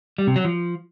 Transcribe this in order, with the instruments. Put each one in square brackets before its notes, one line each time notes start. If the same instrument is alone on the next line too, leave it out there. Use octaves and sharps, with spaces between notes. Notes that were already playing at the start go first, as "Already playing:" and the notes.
[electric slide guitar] G3
C3
F#3
F3